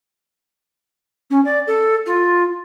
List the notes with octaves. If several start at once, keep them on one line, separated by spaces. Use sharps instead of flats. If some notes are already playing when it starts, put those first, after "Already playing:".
C#4
D5
A4
F4